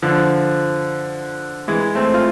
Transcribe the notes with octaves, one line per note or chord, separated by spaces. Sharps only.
D3 F3
E3 G#3
A3 C4
F4